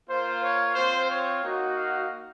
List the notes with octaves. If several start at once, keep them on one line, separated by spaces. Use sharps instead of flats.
A#3 F4 C5
C#5
C4 F4 C5
C#5
A#3 D#4 F#4
F5